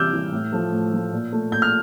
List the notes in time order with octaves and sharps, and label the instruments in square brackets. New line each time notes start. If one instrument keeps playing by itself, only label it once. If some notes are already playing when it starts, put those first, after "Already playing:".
Already playing: [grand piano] C3 E3 G3 D6 E6 F6 G6
E3 G3
A2
F3 A3
A2
F3 A3
A#2
A3
A#2 G6
F6